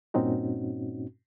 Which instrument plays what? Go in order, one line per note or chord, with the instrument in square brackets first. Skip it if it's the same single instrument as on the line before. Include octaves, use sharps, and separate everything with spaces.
[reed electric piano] G2 A#2 C4 C#4 D#4 F#4